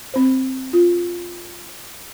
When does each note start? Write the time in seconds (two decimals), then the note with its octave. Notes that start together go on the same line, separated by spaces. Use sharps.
0.14 C4 C5
0.73 F4